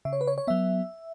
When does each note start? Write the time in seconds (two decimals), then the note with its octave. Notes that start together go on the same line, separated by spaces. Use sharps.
0.05 C#3 E5
0.13 C#5
0.21 B4
0.27 C#5
0.38 C#5
0.47 F#3 B3 E5